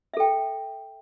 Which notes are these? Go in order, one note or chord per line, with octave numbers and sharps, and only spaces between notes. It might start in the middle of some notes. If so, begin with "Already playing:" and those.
A4 E5 G5